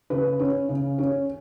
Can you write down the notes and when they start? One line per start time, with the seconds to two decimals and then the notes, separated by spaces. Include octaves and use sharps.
0.10 C#3 B4
0.39 C#4
0.69 C#3
0.98 C#4